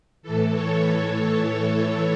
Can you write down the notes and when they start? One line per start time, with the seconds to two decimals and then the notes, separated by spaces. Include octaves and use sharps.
0.22 A2 E3 A4
0.53 C#5